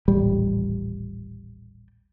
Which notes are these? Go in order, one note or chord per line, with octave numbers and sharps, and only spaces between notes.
D#1 A1 G3